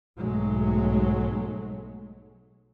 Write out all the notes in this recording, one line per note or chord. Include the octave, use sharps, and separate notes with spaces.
B1 G#2 F#3 G#3 A3